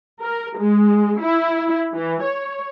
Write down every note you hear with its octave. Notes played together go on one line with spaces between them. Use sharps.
A#4
G#3
E4
E3
C#5